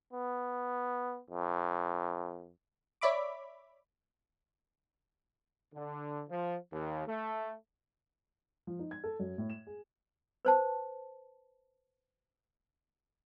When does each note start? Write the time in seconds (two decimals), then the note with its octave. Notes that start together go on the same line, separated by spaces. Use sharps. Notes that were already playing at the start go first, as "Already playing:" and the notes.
0.13 B3
1.30 F2
3.01 C#5 D5 E5 B5 D6
5.75 D3
6.29 F3
6.72 D#2
7.06 A3
8.67 F3
8.79 D#4
8.91 G#6
9.04 A4
9.19 F#2
9.38 A2
9.50 E7
9.67 G#4
10.45 B4 C5 A5